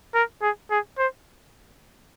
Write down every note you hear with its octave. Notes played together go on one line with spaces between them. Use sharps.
A#4
G#4
G#4
C5